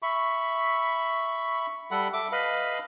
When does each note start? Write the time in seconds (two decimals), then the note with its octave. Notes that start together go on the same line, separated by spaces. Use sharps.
0.02 E5 B5 C#6
1.91 G3 A4 F#5 B5
2.13 A4 E5 D6
2.32 B4 D#5 F5 B5